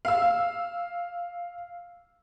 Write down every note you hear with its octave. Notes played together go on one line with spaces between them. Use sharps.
F5 E6